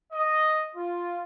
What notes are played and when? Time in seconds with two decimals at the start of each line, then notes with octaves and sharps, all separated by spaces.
0.12 D#5
0.75 F4